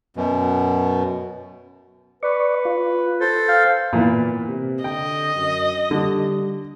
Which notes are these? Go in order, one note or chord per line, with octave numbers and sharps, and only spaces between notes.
F#2 B2
B4 D5 C#6
F4
A4 C5
F5 G5
A#2 E3 B3
C3
D3 D#5 G5
F#2
D3 G3